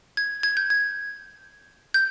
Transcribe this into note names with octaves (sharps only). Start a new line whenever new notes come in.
G#6
G#6
G6
G#6
G6